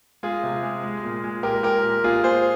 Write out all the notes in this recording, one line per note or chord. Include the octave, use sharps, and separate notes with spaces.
G#3 F4 G#4
C3
G#3
G#3
A#2
G#3
A#2 G4 A#4
G#3 G4 A#4
A#2
A#2 F4 G#4
A#2 G#4 C5